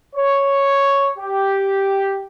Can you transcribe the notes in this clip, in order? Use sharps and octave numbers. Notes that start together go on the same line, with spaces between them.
C#5
G4